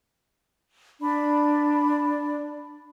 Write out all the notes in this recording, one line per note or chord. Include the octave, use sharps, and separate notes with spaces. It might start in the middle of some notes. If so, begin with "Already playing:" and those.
D4 D5 B5